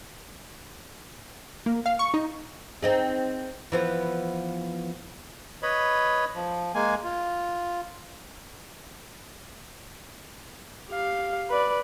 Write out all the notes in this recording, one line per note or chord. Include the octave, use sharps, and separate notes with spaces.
A#3
F5
C#6
D#4
C4 D#4 G#4
E3 F3 B3
B4 C#5 D#5 B5
F3
G#3 A#3 G#5
F4
G4 F5
B4 D5